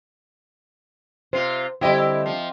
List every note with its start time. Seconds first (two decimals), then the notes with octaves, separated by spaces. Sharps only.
1.33 C3 F4 C5
1.81 D3 G3 C4 E4 G4 D#5
2.26 F3